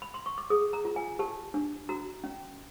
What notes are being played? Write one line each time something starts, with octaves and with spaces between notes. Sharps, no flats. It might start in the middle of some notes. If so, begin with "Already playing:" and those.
B5
C6
C#6
D6
G#4 D#6
A#5
F4
G#5
G4 A5
D4
F#4 A#5
C#4